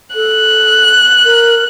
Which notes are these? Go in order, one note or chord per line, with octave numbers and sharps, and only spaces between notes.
A4 F#6
A#4